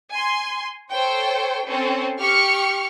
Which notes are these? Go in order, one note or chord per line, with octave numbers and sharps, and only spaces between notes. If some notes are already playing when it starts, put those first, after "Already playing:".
G#5 C6
A4 C5 C#5 G5
C4 C#4 A4 C5
G4 C#6 F6 C#7